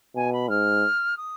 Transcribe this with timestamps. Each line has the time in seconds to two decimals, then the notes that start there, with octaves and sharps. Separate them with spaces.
0.15 B2 G#5
0.32 B5
0.49 G#2 F6
1.17 D#6